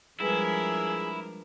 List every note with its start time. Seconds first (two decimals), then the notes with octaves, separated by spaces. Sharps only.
0.20 F3 G3 G#3 D4 E4 G#4 A#4 B4